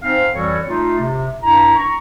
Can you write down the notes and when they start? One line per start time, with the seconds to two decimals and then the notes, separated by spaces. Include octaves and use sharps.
0.02 G#2 C4 F5
0.33 F2 E3 G3 F#4 A4 C#5
0.68 A3 D#4 F4
0.99 C3
1.42 G2 E4 A#5
1.75 A#5 C#6